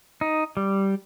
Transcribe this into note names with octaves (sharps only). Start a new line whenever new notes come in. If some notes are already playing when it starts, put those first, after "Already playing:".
D#4
G3